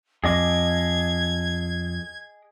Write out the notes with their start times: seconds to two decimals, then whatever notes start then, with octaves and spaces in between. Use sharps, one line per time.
0.24 F2 G#4 D#5 D6 G#6